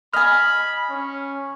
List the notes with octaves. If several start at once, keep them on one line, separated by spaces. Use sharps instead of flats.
D#5 G#5 B5 F6
C#4